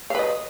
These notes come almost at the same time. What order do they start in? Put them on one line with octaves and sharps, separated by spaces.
F5 B4 D#5